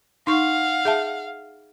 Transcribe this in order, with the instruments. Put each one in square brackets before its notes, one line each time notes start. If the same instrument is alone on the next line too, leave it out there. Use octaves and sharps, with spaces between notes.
[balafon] D#4 C#6 [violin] F5 F#5
[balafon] G#4 E5 A5